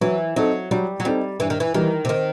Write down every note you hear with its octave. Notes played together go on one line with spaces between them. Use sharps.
E3 F#3
F#3 C4 D#4 A4
F#3 G3
F#3
G3 C4 D#4 A4
G2 E3
D#3
E3
D#3 E3 G3
C3
D#3